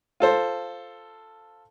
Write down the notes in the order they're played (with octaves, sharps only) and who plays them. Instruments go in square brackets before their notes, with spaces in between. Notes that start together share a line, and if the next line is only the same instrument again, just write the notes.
[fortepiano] F4 A4 C5